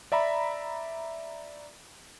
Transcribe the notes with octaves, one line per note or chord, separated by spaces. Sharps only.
D5 E5 A#5 B5